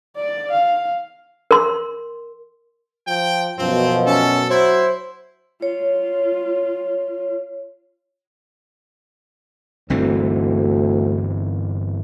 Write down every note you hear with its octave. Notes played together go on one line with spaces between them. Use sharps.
D5
F5
A#4 C6
F3 G5
F#2 B2 F3 C4
C#4 A4
F#3 E4 C5
F4 C#5
G1 D2 E3 C4